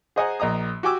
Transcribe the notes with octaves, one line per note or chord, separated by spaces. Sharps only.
G#4 C5 D#5 F#5 G#5 A#5
A#1 D#5 A#5 D#6
F#4 G4 G5 G#5 D6 E6